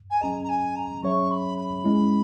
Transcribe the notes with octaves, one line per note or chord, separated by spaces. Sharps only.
G#5
F#3 C#4 G#4 D#5 A#5
A#5
G#5
A#5
F#3 C#4 G#4 C#5 E5 C#6
B5
B5
G#3 C#4 E4